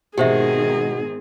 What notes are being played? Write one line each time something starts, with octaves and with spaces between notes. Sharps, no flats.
G#2 B2 D#3 C4 G4 G#4 C5 E5